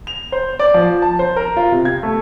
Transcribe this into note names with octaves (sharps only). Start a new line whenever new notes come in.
F7
C5
D5
F3
A5
C5
A#4
F4
C3
G#6
A3